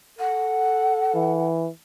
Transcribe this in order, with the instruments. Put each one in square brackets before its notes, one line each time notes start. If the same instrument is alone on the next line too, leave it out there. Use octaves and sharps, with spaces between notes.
[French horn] A4 [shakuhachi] F#5
[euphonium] E3